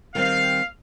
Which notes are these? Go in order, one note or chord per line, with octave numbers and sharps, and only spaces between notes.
D#3 G3 C4 F5